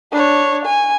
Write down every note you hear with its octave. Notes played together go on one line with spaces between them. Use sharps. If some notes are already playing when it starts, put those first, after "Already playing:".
D4 C#5
G#5